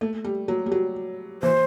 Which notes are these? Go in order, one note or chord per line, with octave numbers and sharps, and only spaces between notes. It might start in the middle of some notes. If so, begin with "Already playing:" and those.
A3
G3
F#3
G3
F#3
E3 C5